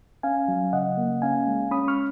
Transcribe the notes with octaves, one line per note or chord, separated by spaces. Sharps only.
C#4 F5 G#5
F#3
C#3 D#5 F#5
A#3
C#4 F5 G#5
G#3
C#4 B5 D#6
C#6 F6